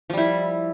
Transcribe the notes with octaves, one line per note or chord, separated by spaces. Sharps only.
F3 G3 E4